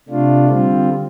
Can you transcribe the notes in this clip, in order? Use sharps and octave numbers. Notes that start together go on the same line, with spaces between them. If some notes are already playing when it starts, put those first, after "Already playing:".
C3 A3 D4 F4
D3 G3 C4 F4